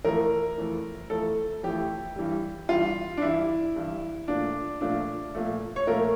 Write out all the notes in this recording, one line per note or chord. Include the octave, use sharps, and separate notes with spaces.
F2 E3 A3 A#4
F2 E3 A3
F2 E3 A3 A4
F2 E3 A3 G4
G2 E3 G3
G2 E3 G3 F4
D4
G2 E3 G3 E4
G2 E3 G3
A#2 F3 A3 D4
A#2 F3 A3 D4
A#2 F3 A3
C#5
A#2 F3 A3 A#4